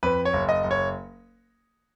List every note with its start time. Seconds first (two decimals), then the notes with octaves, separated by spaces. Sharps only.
0.03 F2 B4
0.25 C#5
0.33 F#1
0.49 D#5
0.64 F#1
0.71 C#5